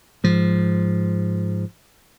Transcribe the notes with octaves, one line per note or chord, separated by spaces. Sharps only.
G#2 F3